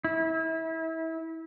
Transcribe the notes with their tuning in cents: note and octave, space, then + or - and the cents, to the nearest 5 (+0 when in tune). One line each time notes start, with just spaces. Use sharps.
E4 -30